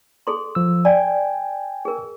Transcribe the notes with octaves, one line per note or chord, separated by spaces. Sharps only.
G#4 A4 C6
F3 E6
D5 G5 G#5
G#4 A#4